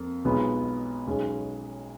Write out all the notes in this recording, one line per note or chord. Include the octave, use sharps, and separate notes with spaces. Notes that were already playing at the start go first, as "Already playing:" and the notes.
Already playing: F2 A#3
B1 B2 G#3 B3 F4
B1 B2 G#3 C#4